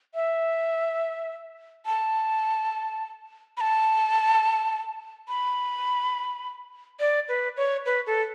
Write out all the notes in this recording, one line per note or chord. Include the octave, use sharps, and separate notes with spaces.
E5
A5
B5
A5
B5
D5
B4
C#5
B4
A4